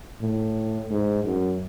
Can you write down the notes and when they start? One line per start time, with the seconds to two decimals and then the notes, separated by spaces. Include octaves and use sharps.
0.21 A2
0.90 G#2
1.24 F#2